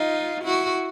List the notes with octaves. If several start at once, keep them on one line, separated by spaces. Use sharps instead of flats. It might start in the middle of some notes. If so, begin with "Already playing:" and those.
Already playing: D#4 F4
E4 F#4